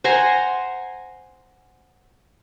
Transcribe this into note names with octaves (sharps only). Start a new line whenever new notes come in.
C5 F#5 G#5 A#5